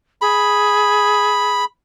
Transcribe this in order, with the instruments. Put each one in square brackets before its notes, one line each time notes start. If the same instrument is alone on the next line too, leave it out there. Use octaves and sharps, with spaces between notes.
[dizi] G#4 [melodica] B5